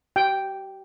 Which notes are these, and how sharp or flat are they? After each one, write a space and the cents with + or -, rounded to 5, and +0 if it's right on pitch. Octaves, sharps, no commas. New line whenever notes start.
G4 -40 G5 +0